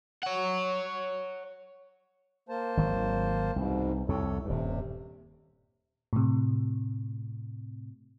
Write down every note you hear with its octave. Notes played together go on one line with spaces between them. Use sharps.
C#5 F#5
A#3 C5 A5
G#1 D#3 F#3
C2 G#2 B2
C2 F2 C3 A4 C#5
D#1 G2 C3
A2 C3